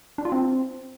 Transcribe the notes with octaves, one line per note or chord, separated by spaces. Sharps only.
D4
F4
C4